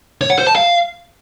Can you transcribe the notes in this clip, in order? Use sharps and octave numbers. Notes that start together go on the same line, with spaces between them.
C#5
F#5
C5
A5
F5